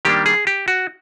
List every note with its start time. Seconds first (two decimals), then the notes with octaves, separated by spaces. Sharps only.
0.05 D#3 G3 A#3 D4 G4
0.26 G#4
0.47 G4
0.68 F#4